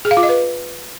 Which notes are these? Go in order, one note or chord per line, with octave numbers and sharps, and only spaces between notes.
G#4
F5
F4
D#5
B4